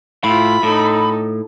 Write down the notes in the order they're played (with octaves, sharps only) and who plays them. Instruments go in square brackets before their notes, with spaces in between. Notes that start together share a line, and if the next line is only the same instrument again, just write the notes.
[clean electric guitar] A2 [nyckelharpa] E4 F4 [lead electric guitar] B5
[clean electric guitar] A2 [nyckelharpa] D#4 A4